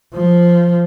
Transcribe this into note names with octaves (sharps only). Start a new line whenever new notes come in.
F3